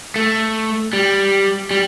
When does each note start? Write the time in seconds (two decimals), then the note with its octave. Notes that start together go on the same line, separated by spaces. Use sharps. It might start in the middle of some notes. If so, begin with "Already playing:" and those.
0.16 A3
0.93 G3
1.71 G3